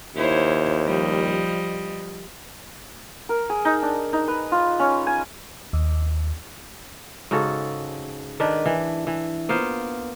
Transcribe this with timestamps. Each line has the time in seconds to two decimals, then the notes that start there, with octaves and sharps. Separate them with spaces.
0.16 D#2 E4 C5 C#5
0.85 F3 G3 D#5
3.29 A#4
3.50 G#4
3.65 D#4
3.82 D4
4.13 D#4
4.28 B4
4.52 F4
4.79 C#4
5.07 G#5
5.73 D#2
7.31 G#2 C#3 F#4 A4
8.40 D#3 D4 B4
8.66 E3
9.07 E3
9.49 A#3 B3 F4 C5